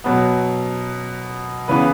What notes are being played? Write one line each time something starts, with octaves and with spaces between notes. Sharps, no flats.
B2 F#3 B3
C#3 E3 B3 B4